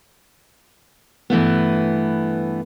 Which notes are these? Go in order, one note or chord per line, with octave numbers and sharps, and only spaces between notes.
G2 E3 A3 B3